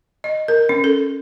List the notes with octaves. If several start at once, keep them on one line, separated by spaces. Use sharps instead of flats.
D#5
A#4
C#4
A4